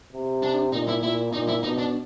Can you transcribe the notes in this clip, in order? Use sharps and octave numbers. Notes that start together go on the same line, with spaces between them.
C3
D4
A#2 D#4
E4
A#2 E4
A#2 D#4
E4
B2 D#4
D4